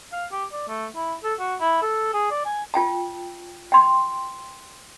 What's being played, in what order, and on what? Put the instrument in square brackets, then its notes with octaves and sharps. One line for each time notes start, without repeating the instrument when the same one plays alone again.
[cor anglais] F5
G4
D5
A3
E4
A4
F#4
E4
A4
G#4
D5
G#5
[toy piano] F4 G5 A5
G5 C6